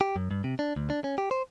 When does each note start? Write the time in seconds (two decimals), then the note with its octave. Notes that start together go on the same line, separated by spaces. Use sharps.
0.01 G4
0.16 F#2
0.31 G2
0.44 C3
0.59 D4
0.76 D2
0.90 D4
1.04 C#4
1.18 G4
1.31 C5